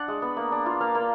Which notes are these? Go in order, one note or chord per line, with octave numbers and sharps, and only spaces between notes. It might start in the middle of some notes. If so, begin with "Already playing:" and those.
Already playing: D4 F#5
G#3
B3
A#3
D4
F4
A#3 F5
A#3